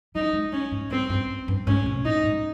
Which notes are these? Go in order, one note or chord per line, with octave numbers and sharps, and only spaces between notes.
G3 D#4
G#3
G3 C#4
G#2
G2 C4
G2
G2
G#2 C#4
C3
A#2 D#4
G#2